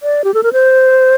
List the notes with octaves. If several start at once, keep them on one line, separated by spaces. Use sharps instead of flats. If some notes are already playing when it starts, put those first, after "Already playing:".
D5
G4
A4
A#4
C5